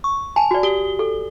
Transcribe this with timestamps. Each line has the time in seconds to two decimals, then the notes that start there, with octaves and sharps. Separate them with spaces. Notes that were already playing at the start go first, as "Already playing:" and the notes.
0.04 C#6
0.36 G#5 A5
0.51 F#4 D5
0.63 G4 G7
0.99 A4